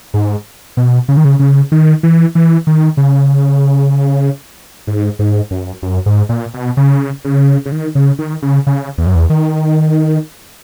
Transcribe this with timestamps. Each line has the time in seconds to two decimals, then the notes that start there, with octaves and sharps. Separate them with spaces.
0.14 G#2
0.77 B2
1.08 C#3
1.17 D#3
1.25 C#3
1.39 C#3
1.72 D#3
2.03 E3
2.35 E3
2.67 D#3
2.97 C#3
4.87 G#2
5.19 G#2
5.51 F#2
5.82 F#2
6.06 G#2
6.29 A#2
6.54 B2
6.77 C#3
7.25 C#3
7.65 C#3
7.72 D#3
7.95 C#3
8.19 D#3
8.42 C#3
8.67 C#3
8.98 E2
9.06 F#2
9.15 E2
9.30 D#3